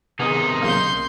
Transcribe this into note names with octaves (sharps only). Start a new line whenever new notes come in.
C3 D#3 B3 D#4 G#4
B1 C#3 A#3 C6 G6